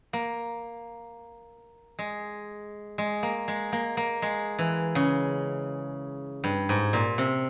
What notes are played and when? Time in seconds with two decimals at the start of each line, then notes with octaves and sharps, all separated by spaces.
0.13 A#3
1.99 G#3
2.98 G#3
3.23 A#3
3.48 G#3
3.73 A#3
3.97 A#3
4.22 G#3
4.59 E3
4.95 C#3
6.44 G2
6.69 G#2
6.93 A#2
7.18 C3